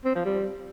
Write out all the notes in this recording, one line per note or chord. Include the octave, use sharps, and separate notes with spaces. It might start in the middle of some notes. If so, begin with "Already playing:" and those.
C4
F3
G3